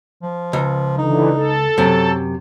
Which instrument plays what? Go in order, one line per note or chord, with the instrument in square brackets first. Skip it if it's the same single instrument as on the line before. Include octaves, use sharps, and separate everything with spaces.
[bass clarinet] F3
[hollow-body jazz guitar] C#2
[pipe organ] D3 E3 [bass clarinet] D#4
[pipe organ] A4
[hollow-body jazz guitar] F#2 C3 [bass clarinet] F#3